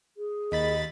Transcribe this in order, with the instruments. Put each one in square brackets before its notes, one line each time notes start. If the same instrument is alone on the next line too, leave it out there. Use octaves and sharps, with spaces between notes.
[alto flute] G#4
[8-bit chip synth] D#2 B5 A6 [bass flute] D#5